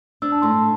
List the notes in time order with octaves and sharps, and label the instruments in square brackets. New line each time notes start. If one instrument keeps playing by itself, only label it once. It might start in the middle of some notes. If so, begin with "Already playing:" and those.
[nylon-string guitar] D4 [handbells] E6
[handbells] A5
[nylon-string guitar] A2 [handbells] C6